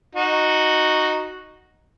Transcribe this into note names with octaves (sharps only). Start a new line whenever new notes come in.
D#4 F#4